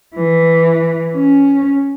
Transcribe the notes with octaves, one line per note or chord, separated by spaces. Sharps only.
E3
C#4